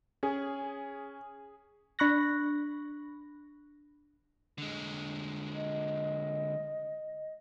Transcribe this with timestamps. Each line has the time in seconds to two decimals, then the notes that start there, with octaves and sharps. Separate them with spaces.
0.23 C#4 G#4
1.99 D4 B5 C#6 F#6 A#6
4.58 D3 G#3
5.54 D#5